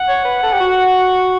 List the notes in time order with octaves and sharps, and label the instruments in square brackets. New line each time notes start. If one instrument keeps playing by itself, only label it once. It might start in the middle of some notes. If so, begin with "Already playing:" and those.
Already playing: [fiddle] F#5
[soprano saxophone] C#5
B4
A4
G4
F#4